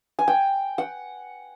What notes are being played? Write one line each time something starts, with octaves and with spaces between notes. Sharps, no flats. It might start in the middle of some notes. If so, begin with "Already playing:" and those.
G#5
G5
F#5